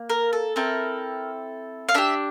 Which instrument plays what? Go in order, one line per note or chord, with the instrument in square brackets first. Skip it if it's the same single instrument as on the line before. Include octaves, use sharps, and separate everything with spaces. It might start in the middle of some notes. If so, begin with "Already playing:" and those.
Already playing: [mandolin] A#3
A#4
A4
C4 E4 A4 A#4
F5
D4 G4 E5